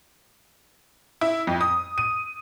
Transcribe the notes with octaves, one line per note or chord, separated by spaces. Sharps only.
E4
F2
D#6
D#7